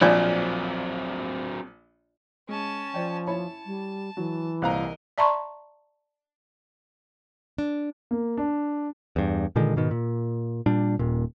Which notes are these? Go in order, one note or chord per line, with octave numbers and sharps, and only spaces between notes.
A#1 F3 F#3 C4 C#5 D5 G#5
G#3 C#4 A5
F3 C5 D5 G5
E4 C#5 A5 B5
G3
E3 F#3
C2 A#2 A#4 C5 D#5 F5 A#5 F#6
D5 E5 A5 A#5 C6 C#6
D4
A#3
D4
E2 G2
A#2 D3 D#3 G#3
G#2 B2 D#3
A#2
A#2 G3 D4
D#1 A#2